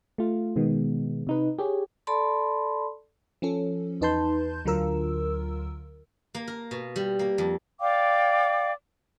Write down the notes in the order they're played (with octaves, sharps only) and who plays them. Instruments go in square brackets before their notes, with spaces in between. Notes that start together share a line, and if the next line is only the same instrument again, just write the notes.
[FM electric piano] A3 F4
B2 D#3 G#3 B3
C3 D#4 B4
G4 G#4 C#5
[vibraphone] A4 D5 A5 B5 C6
[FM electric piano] F3 C#4 A4
E2 D#4 B4 A5 C6 G6
D2 D3 F#3 F4 A#4 E6
[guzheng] A#3
A#4
B2
G3
A#3
F2
[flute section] D5 F5 G5 D6